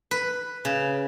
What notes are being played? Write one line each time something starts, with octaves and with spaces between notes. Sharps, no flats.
B4
C#3